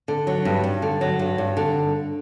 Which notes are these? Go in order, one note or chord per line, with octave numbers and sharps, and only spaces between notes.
D3
F#3
G2
G2
D3
F#3
G2
G2
D3